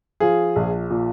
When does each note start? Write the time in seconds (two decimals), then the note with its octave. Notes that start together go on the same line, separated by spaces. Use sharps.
0.20 F3 F4 G#4
0.56 A#1
0.90 A#2